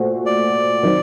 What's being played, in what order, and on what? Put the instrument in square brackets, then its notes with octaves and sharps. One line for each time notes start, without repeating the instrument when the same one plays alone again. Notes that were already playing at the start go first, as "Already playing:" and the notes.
Already playing: [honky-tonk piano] A#2 A3 F#4 C5
[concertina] D5
[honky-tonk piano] D#3 F#3 C4 D#4